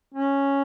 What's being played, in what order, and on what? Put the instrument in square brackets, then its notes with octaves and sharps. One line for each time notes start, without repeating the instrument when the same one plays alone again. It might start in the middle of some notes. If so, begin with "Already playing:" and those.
[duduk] C#4